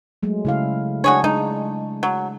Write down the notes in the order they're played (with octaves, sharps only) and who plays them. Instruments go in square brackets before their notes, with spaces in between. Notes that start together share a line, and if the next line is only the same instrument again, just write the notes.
[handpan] F#3 G#3 A3
C#3 E4 F5
[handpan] D4 [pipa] F#4 G#4 C#5
[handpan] G#3 [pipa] D#4
[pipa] F#3